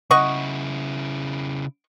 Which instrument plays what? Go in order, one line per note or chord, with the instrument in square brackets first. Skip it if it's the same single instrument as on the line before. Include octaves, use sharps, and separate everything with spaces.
[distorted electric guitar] C#3 E4 [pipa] D#5 F#5 C#6